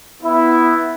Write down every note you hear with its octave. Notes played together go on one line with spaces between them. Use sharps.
B3 E4